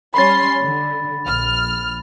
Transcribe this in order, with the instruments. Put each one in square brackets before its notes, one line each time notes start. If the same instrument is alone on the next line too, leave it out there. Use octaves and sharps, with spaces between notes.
[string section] G3 C#4 C6 [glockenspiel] B5 A6
[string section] D3
A#1 F6